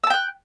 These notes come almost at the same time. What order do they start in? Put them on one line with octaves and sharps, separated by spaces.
E6 A5 G5 F#6